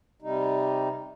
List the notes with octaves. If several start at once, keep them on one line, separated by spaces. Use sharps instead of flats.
C3 G3 D#4